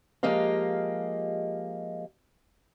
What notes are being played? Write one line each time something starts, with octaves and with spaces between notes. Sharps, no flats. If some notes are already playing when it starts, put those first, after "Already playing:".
F3 G#3 A#3 G4 D#5 F5